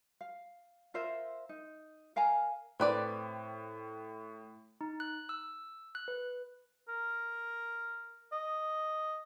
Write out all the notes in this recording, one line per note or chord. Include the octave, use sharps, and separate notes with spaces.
F5
F4 A#4 C5 E5
D#4
A#4 F5 G#5 A#5
A2 C4 B4 D5
D#4
F#6
E6
F#6
B4
A#4
D#5